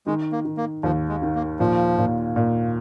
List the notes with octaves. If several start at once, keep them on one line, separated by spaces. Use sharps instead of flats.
D#3 G#3
A#3
D#3
A#3
D#2 F3
G#3
D#3
A#3
A#2 F3
A#2
A#2